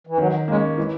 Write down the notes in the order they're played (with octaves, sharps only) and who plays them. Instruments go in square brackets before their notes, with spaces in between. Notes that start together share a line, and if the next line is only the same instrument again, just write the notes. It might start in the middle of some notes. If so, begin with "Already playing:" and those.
[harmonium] E3
[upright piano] D#3 [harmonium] F#3
[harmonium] G#3 [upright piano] A#3 C#4
[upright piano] E3 [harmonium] G#3